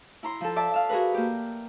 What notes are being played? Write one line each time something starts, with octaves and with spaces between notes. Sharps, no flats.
E4 A#5 C6
F3 A4
D5 E5 A5
E5 F5
F#4 G#4 A#4 B4
A#3 G4